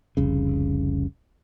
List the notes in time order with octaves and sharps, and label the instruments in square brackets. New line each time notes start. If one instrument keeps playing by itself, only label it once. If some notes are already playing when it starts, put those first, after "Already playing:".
[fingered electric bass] F1 C2 C#3